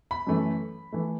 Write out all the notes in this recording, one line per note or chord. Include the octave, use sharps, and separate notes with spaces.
B5
F#2 E3 A3
E3 A3